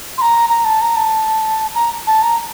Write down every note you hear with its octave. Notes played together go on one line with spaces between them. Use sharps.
C6
A#5
A#5
A5
A#5
A5
A#5
A5
A#5